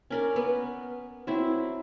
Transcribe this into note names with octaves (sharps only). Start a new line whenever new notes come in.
C#4 A#4 D5
B3
F#3 C4 E4